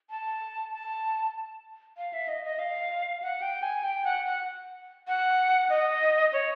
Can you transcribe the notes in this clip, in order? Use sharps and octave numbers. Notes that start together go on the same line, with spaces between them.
A5
A5
F5
E5
D#5
D#5
F5
F#5
G5
G#5
G5
F#5
F#5
F#5
D#5
C#5